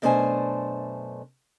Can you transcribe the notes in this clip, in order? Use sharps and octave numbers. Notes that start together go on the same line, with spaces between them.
F#2 B2 A3 D4 C5 G#5